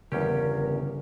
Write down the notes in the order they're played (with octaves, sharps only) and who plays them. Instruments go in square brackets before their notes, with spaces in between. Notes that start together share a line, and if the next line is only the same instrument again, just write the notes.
[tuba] G1 [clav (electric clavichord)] E2 C#4 G4 [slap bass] C#3 A#3 [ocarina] A#4